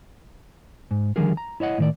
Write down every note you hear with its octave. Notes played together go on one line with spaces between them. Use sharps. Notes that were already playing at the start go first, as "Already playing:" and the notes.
G#2
D3 D#3 F3 G3 G#4 A#4
A#5
E4 C#5 D#5 F#5
A2 D#3 D5